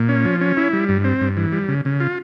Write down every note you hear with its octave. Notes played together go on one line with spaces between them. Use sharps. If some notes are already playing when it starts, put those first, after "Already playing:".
Already playing: A#2
C#4
F3
C#4
E4
G3
G2
C4
G2
E3
G3
C#3
C#3
F4